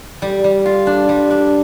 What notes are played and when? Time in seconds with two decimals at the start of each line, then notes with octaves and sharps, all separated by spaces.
0.22 G3
0.44 G3
0.66 F4
0.87 D4
1.09 G3
1.30 D4